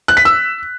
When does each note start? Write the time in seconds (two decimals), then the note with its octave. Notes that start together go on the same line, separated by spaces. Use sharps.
0.08 F#6
0.17 B6
0.25 E6